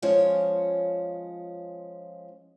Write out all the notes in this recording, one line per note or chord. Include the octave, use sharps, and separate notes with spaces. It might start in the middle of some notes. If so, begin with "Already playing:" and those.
F3 G#3 C#4 F4 C5 C#5